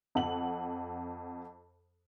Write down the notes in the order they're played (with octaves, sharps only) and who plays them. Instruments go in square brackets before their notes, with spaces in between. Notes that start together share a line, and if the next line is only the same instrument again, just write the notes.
[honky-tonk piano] F2 F#5 F#7